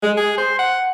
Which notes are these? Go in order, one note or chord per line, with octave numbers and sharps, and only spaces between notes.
G#3
G#4
C5
F#5